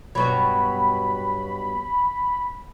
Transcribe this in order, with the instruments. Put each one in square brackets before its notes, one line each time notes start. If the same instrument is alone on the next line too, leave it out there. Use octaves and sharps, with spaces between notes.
[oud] G2 B2 F#3 [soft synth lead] B5